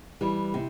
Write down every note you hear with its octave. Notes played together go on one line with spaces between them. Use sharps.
E3 G3
C3